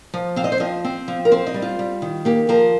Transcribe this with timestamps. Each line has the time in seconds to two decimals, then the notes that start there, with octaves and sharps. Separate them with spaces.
0.14 F3
0.36 C4 F5
0.44 D#5
0.52 C5
0.60 F3 D#5
0.84 C4
1.08 F3
1.25 A#4
1.32 C4 C5
1.47 D#5
1.54 G3
1.62 F4
1.79 G3
2.02 D#3
2.25 A#3 G4
2.49 F3 A#4